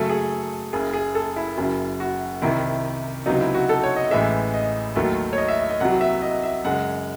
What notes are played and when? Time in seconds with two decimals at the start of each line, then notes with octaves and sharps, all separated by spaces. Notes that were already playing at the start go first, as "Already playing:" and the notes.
Already playing: F#2 C#3 F#3 A3 A4
0.09 G#4
0.73 F#1 F#2 C#3 G#4
0.93 G#4
1.15 A4
1.36 E4
1.57 F#1 F#2 C#3 F#3
2.00 F#4
2.42 C2 C3 D#3 E4
3.26 C#2 C3 F#3 D#4
3.41 E4
3.54 F#4
3.69 A4
3.83 C#5
3.96 D#5
4.11 A1 A2 E3 G#3 E5
4.54 D#5
4.96 D#2 D#3 F#3 A3
5.33 C#5
5.38 D#5
5.48 E5
5.59 E5
5.69 D#5
5.80 C2 C3 F#3 F#5
6.01 E5
6.22 D#5
6.43 E5
6.65 F#2 C#3 G#3 F#5